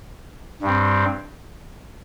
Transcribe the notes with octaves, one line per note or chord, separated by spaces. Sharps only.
G2 G3 C4